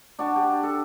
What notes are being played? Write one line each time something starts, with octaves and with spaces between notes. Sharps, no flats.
D4 F#4 A5
G4
A4